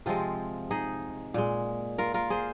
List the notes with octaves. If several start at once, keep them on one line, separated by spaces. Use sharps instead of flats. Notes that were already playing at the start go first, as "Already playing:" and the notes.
C3 F3 G#3 C4 F4
D#4 G#4
A#2 G#3
F4 A#4
F4 A#4
G#4 C5